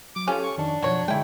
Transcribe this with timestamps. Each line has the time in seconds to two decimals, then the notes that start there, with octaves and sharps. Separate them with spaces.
0.16 F#3 D6
0.28 C#4 F4 G4 A4 G#5
0.44 C#6
0.57 F2 D#3 D4 A5
0.82 F#2 B2 F3 F#3 C#5
1.08 D3 G#3 E4 G5